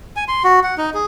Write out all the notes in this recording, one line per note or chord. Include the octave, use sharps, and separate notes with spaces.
G#5
C6
F#4
F#5
D#4
G#4